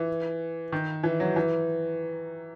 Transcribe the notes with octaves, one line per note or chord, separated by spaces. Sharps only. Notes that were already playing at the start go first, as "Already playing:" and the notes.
Already playing: E3
D#3
E3
F#3
E3